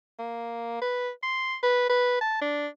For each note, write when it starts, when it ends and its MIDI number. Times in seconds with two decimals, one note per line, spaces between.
0.19 0.79 58
0.82 1.10 71
1.23 1.56 84
1.63 1.85 71
1.89 2.19 71
2.21 2.41 81
2.41 2.68 62